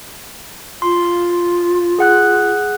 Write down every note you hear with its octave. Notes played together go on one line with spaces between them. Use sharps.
F4 C6
G#4 F#5 F#6